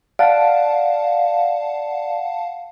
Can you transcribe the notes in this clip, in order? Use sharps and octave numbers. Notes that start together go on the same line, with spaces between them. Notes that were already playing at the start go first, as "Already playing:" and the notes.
D5 F5 F#5 A5